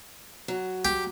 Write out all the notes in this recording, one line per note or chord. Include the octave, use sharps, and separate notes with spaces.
F#3
G4